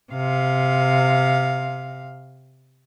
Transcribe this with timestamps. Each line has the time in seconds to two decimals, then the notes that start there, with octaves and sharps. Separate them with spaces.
0.13 C3 F5